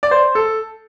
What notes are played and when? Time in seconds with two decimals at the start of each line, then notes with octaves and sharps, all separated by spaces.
0.03 D5
0.11 C5
0.35 A4